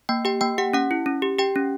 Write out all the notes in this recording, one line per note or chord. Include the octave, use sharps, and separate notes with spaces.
A#3 G5
G4 G5
A#3 G5
G4 F#5
C#4 F#5
E4
C#4
G4
G4 G5
C#4